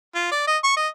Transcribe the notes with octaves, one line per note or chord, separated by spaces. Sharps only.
F4
D5
D#5
C#6
D#5